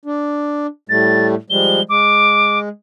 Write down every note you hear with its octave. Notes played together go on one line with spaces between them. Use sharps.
D4
A2 G3 A3 A6
F3 G3 G#3 G7
G#3 D6